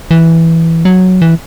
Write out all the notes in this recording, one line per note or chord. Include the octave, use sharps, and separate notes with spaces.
E3
F#3
E3